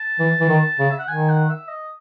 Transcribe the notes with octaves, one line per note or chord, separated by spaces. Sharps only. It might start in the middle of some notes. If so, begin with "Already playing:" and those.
Already playing: A5
E3
E3
D#3
C#3
E5
F#5
D#3 G#5
F#5
E5
D#5